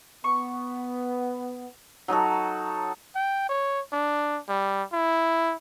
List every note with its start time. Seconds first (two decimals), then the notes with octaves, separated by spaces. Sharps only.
0.24 B3 C#6
2.08 F#3 D#4 F#4 A4
3.15 G5
3.49 C#5
3.92 D4
4.48 G3
4.93 E4